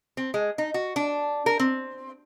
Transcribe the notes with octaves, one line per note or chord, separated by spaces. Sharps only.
C4
G#3
D#4
F#4
D4
A#4
C4